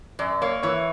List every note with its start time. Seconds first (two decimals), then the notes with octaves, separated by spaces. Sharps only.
0.19 F#2 D5
0.42 A#3 C#5
0.63 E3 C#5